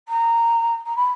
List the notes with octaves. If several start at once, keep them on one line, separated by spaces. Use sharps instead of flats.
A#5
A#5
B5